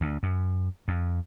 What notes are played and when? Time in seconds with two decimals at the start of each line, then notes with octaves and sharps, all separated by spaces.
0.01 D2
0.23 F#2
0.88 F2